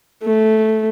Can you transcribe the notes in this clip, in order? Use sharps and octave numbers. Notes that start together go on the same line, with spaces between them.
A3